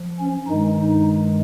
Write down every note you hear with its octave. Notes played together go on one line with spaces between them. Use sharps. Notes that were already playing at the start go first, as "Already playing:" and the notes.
Already playing: F3
C#4
G2 D#3 G#3 D#4
D#4